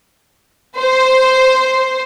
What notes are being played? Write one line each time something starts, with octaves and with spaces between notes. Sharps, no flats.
C5